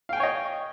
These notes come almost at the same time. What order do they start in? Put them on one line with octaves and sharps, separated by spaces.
F5 G5 G#5 C#5 D#5